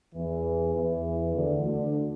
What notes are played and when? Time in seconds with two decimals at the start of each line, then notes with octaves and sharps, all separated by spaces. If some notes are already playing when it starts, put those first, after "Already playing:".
0.15 E2 E3
0.75 E2 E3
1.36 D2 D3
1.65 D2 D3